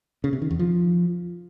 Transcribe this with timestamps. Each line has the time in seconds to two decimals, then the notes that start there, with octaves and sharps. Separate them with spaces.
0.24 C#3
0.33 C3
0.42 D#3
0.51 E2
0.59 F3